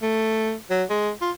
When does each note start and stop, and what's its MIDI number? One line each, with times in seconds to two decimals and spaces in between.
0.02 0.54 57
0.70 0.84 54
0.90 1.11 56
1.21 1.31 65